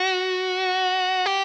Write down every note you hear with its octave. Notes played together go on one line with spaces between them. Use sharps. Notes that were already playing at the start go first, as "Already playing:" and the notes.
Already playing: F#4
G4